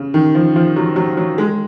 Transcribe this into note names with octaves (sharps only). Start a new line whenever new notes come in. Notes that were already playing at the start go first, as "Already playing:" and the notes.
Already playing: C#3
D#3
F3
F3
F#3
F#3
F#3
G#3